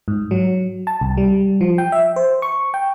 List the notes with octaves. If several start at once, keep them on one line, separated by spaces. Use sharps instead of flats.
G#2
F#3
A5
C2
G3
F3
G5
E5
C5
C#6
G5